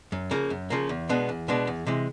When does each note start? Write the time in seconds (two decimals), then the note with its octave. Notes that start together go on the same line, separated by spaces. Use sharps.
0.12 F#2
0.31 C#3 F3 A#3
0.50 F#2
0.70 C#3 F3 A#3
0.89 E2
1.09 B2 G#3 B3 D4
1.29 E2
1.48 B2 G#3 B3 D4
1.67 E2
1.86 C3 E3 G#3